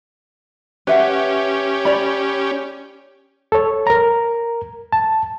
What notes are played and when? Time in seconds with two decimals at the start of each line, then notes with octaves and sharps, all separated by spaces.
0.87 C#4 G4 B4 E5 F#5
1.85 C#5 D5 B5
3.52 A4 C#5
3.87 A#4 A#5
4.92 A5